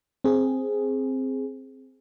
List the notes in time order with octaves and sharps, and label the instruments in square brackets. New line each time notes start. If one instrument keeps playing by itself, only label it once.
[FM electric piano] C4 G#4